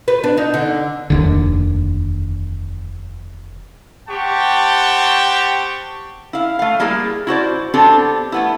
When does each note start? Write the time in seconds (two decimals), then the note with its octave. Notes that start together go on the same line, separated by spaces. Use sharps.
0.08 B4
0.24 D4
0.37 D#4
0.54 D3
1.10 F1 D#2 D3
4.08 C4 G4 F#5 G5 A5 C#6
6.33 E4 F5
6.59 A3 F5
6.80 G3 A#3 E4 G#4
7.27 E4 F#4 C5 D5
7.74 B3 C4 D4 G4 A4
8.32 A3 B3 E4